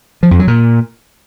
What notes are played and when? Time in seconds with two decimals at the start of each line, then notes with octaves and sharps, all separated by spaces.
0.23 F3
0.31 F2
0.39 F#3
0.47 A#2